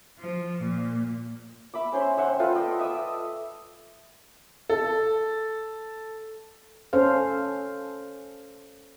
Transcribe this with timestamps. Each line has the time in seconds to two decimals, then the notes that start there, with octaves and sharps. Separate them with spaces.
0.19 F3
0.61 A#2
1.74 E5 B5 D6
1.92 C#4 C5 C#5 C6
2.17 C5 E5 F#5 G5
2.40 F4 A4 B4 E5
2.55 D5 D#5
2.79 E5 D#6 E6
4.70 A4
6.93 C#4 A4 C5 F5